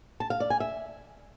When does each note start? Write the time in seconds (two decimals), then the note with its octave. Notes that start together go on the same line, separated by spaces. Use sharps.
0.20 A5
0.30 F5
0.40 D5
0.50 G#5
0.60 E5